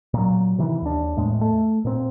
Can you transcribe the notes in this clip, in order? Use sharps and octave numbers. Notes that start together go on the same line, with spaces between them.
A#2 F#3
C3 D#3 E3
D#2 D4
E2 A2 G#3
A3
A#2 C4